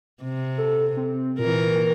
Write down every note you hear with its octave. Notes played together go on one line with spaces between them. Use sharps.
C3
A4
C4
A#2 E3 A#4